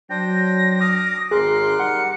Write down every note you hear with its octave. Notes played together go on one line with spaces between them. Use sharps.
F#3 D4 C5 G5 A#6
D6 D#6 F6
G#1 G#4 A#4 C6 D6 F#6
G3 D#4 F#5 C#7